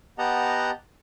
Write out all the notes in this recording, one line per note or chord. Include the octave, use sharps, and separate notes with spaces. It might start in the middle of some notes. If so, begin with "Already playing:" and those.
B3 G4 D#5 F#5 A5 A#5